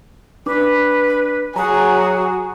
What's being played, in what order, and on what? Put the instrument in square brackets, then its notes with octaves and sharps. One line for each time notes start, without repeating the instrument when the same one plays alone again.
[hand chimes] D4 D6 [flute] B4
[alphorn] F#3 [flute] F#4 [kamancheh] G#4 [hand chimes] A#5